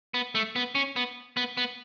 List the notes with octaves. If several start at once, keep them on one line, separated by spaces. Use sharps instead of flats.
B3
A3
B3
C#4
B3
B3
B3